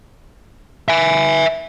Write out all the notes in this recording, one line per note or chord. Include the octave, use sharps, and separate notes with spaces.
E5 G#5